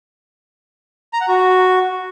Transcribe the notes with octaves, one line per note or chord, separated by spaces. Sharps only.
A#5
F#5
F#4